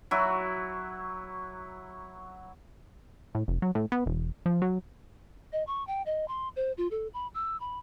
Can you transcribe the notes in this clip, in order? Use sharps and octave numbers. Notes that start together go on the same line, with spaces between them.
F#3 E4 F#4
A2
F1
F#3
A2
B3
E1
F3
F#3
D#5
C#6
G5
D#5
C6
C5
F4
A4
B5
E6
B5